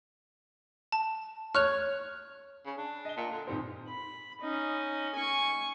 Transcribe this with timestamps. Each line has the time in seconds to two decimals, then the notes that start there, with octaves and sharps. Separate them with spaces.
0.92 A5
1.55 C#5 F6 F#6 F7
2.66 C#3
2.78 D4
3.05 D#5 G7
3.17 A#2
3.32 D3
3.47 A#2 D#3 G3 C4
3.88 B5
4.41 C#4 D#4
5.16 G#5 C#6